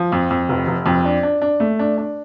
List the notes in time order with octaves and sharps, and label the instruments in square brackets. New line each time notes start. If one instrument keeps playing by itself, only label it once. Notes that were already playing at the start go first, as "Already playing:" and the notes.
Already playing: [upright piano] F3
F2
F2
F1
F1
F2
D4
D4
D4
A3
D4
D4